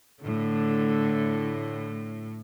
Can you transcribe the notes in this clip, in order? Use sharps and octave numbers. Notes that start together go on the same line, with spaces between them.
A2 D3